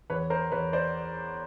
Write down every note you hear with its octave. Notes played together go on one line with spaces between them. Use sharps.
E2 B4 C#5
A#4 C5
E2 B4 C#5
C5 D5